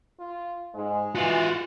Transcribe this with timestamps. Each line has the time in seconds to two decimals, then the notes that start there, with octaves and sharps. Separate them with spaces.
0.20 F4
0.75 G#2 G#3
1.15 E3 F4 F#4